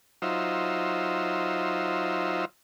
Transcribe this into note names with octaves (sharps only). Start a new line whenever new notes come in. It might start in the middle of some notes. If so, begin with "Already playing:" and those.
F#3 D#4 F4 C5 E5